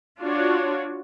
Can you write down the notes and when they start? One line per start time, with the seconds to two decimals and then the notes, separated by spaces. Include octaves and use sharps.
0.21 D4 F4 F#4 C#5